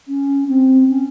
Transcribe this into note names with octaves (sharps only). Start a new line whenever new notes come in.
C#4
C4
C#4